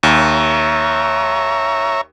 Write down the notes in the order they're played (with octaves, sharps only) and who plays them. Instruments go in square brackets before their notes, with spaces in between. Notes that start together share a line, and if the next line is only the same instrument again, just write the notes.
[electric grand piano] D#2 [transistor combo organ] C#5 E5 A#5